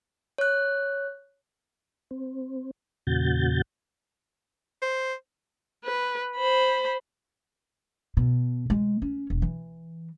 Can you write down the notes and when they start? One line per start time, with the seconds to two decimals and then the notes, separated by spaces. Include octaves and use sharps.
0.38 C#5 F#6
2.11 C4
3.07 E2 A#2 C#3 F#4 G6 A6
4.82 C5
5.85 B4
6.37 C5 B5
8.17 B2
8.70 G#3
9.02 C#4
9.30 E1
9.42 E3